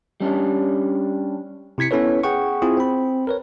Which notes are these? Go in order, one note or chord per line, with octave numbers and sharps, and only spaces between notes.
G3 C#4 D4
C3 E4 G#6 B6 C#7
B3 C#4 E4 A4 B4 C#5
G#4 F#5 G5 C#6
C4 E4 F4 G#4
C4 B5
A#4 B4 C#5